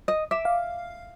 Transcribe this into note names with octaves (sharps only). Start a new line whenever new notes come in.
D#5
E5 D6
F5